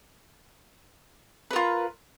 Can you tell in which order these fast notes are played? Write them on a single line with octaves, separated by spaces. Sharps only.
B4 A#4 F4